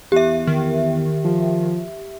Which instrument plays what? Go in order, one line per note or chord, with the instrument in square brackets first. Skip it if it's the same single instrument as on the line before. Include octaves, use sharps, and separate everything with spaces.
[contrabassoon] E2 [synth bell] G4 E5
[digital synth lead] D#3
[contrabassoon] F3